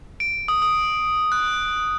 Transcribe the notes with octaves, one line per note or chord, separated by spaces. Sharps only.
D7
D#6
D#6
F#6